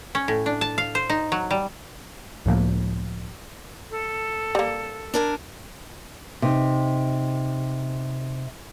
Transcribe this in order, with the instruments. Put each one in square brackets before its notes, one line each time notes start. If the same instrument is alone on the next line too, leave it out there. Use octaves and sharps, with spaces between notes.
[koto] C#4
A2
D4
A5
F5
C5
D#4
F#3
G3
[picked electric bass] C#2 A2 F3 A#3
[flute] A4
[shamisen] G3 A#3
[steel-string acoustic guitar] D4 A#4 G#5
[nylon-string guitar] C3 D#4